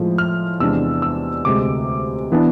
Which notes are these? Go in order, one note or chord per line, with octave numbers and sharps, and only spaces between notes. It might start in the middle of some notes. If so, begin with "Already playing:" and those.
Already playing: A2 F3 G#3
F6
E2 C3 G#3 D4 E6
E6
D2 C3 G#3 D6
E3 B3 D4